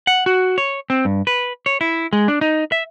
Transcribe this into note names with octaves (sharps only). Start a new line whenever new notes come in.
F#5
F#4
C#5
C4
G2
B4
C#5
E4
G#3
D4
D#4
E5